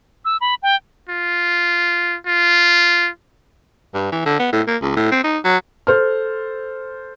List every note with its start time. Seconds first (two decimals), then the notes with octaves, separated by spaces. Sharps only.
0.25 E6
0.41 B5
0.63 G5
1.09 F4
2.26 F4
3.94 G2
4.12 E3
4.26 D3
4.39 B3
4.53 A2
4.67 A#3
4.82 C#2
4.96 A2
5.12 C4
5.24 D#4
5.44 F#3
5.87 A4 C5 F6